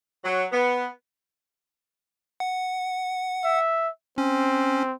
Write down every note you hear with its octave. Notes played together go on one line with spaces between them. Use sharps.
F#3
B3
F#5
E5
C4 C#4